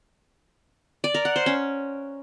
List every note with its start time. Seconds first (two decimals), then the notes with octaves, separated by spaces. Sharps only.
1.04 D5
1.14 A#4
1.25 F#5
1.36 C5
1.46 C#4